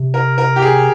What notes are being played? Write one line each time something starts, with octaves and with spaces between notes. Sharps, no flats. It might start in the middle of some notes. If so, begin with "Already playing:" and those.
Already playing: C3
A#4
A#4
G4
G#4